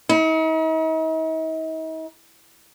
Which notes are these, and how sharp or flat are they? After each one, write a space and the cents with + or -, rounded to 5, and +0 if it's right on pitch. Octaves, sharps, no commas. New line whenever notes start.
D#4 +45